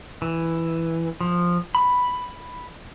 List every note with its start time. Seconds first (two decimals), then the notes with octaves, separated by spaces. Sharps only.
0.22 E3
1.21 F3
1.75 B5